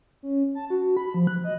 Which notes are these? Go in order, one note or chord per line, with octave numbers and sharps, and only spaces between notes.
C#4
A5
F#4
B5
F3
F#6
D#5